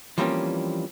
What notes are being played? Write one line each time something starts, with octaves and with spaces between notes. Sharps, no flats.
E3 F3 G3 A#3 C4 C#4